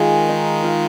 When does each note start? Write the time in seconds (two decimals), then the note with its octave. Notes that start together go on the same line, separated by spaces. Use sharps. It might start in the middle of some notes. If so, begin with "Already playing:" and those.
Already playing: D#3 G#3 F4 G#4 A#4
0.29 D#4
0.63 F4